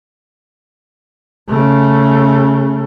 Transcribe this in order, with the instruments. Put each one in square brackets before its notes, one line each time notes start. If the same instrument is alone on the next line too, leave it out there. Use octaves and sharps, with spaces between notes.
[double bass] C#3 A3